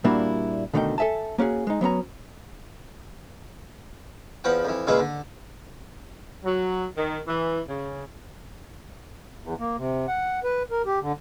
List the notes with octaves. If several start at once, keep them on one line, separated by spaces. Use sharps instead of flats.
A#2 G3 A#3 D4 E4 F#4
B2 D3 D#3 A3 D#4 G5
A4 A#4 E5 G#5 A5
A#3 C#4 F#4 G#4
G#3 D#4
F#3 B3 C#4 A#5
E2 F3 B4 F#5 G5
F2 E3
A#2 C#3 G#3 F4 B4 E5
D3
F#3
D#3
E3
C#3
E2
A#3
C3
F#5
B4
A#4
G4
D3